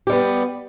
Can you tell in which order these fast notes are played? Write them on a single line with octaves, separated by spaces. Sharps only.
G4 G3 B3